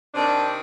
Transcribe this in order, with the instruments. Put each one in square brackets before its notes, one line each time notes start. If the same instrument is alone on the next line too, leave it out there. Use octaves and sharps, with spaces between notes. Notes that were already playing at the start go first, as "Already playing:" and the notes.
[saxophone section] C3 D#3 D4